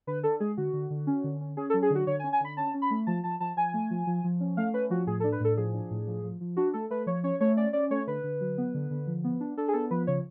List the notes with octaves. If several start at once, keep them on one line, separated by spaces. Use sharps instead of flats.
D3 B4
D4 A4
G#3 G#4
D3 F#4
D3
D3
C#4
D3
C#4
C#4 G#4
A4
F#3
G#4
D3 F#4
D3 C#5
G#5
C#4
G#5
D3 B5
C#4 A5
C#4
B5
A3
F3 A5
F3 A5
F3 A5
F3 G#5
A3
F3
F3
F3
C#4
A3 F5
C#4 B4
F3 F#4
A2 G#4
D4 A4
B4
A2 A4
F3 G#4
D4
A2
F3
F3
F3
D4 F#4
A3 A4
A3 B4
F3 C#5
C#4 C#5
A3 C#5
C#4 D5
C#4 D5
A3 C#5
D3 B4
D3
F#3
B3
D3
D3
F3
B3
D4
D4 A4
G#4
B3 A4
F3 B4
C#3 C#5